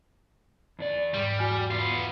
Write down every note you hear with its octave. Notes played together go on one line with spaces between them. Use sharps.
E2 D4 D5
G#2 G3
E2 F#4 G#5 F6
B3 F4